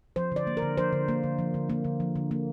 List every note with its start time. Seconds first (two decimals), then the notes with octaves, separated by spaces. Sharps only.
0.16 F3 C5
0.32 D3 D5
0.47 A#3
0.57 A#4
0.62 D3
0.77 F3 C5
0.93 D3
1.08 A#3
1.24 D3
1.39 F3
1.54 D3
1.70 A#3
1.85 D3
2.00 F3
2.16 D3
2.31 A#3